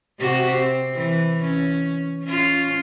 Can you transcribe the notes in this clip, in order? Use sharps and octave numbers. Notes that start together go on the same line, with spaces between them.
C3 F#4 G4
C4
E3
C#4
C#4 F4